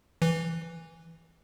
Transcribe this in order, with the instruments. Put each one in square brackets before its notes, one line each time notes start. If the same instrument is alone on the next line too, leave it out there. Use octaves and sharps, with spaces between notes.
[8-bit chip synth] E3